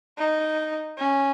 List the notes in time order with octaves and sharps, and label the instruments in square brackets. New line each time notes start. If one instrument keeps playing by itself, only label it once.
[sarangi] D#4
C#4